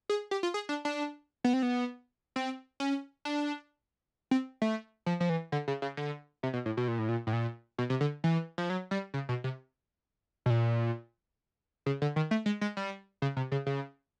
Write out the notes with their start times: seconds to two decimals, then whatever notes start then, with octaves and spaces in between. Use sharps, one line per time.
0.09 G#4
0.31 G4
0.43 F4
0.54 G#4
0.69 D4
0.85 D4
1.44 B3
1.53 C4
1.63 B3
2.36 C4
2.80 C#4
3.25 D4
4.31 C4
4.62 A3
5.06 F3
5.20 F3
5.29 E3
5.52 D3
5.68 C#3
5.82 C#3
5.97 D3
6.43 C3
6.54 B2
6.66 A2
6.77 B2
6.88 A#2
6.98 A2
7.09 A#2
7.27 A2
7.33 A#2
7.78 B2
7.90 C3
8.01 D3
8.24 E3
8.58 F3
8.70 F#3
8.91 G3
9.14 C#3
9.29 B2
9.44 C3
10.46 B2
10.50 A#2
11.86 C#3
12.02 D3
12.16 D#3
12.31 A3
12.46 G#3
12.61 G#3
12.77 G3
13.22 C#3
13.37 C3
13.52 C#3
13.66 C#3